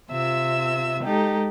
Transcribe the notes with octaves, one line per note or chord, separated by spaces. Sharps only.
C3 F4 E5 E6
G#3 D#4 G4 A4